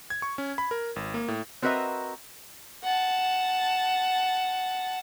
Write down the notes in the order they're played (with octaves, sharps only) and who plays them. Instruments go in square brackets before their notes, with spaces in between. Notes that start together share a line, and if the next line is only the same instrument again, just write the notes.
[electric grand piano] G#6
C#6
C#4
B5
A#4
G#1
A#3
A2
[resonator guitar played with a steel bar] C4 F#4 A#4 B4 D#5 E5
[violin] F#5 A5